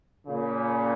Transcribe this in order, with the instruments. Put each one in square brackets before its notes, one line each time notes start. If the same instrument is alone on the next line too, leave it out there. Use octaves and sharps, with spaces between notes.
[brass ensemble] A#2 C#3